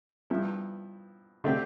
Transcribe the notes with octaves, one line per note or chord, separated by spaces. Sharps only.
G2 F3 B3 E4
D3 A3 C4 G4